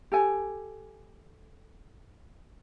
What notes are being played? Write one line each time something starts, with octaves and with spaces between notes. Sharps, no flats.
G4 A4 G#5